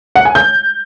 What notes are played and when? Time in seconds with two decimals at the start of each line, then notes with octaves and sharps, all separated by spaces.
0.16 F#5
0.25 G#5
0.35 G6